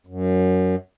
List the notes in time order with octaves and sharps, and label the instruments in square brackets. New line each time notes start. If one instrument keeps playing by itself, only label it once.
[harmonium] F#2